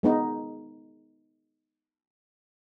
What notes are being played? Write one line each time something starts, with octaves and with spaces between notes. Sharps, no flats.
G#3 B3 D#4